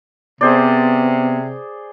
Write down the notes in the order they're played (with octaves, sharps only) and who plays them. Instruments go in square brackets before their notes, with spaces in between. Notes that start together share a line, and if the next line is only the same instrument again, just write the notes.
[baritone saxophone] C3 [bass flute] B3 [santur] G#4 C5 D5